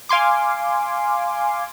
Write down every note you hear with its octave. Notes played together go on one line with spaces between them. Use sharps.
F5 G#5 C6 D6